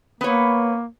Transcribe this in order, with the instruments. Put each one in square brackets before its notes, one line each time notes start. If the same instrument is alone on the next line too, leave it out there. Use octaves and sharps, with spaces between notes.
[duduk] A#3 [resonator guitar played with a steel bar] B3 C#5